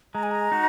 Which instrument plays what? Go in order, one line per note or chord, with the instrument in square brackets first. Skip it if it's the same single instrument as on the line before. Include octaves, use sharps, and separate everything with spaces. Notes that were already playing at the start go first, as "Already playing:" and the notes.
[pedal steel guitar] G#3 [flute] A#5
[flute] G#5
A#5
[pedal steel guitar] D#4 F#4